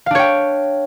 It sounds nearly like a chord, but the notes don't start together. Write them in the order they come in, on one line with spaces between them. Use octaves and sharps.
F5 D4 C#5 G5